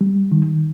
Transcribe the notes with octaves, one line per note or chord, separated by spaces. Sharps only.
G3
D#3